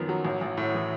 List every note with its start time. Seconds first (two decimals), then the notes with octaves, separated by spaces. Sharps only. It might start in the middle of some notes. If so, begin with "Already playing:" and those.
Already playing: F#2 D#3 F3 B3
0.09 F#3
0.25 A1
0.41 A1
0.57 A2
0.74 E3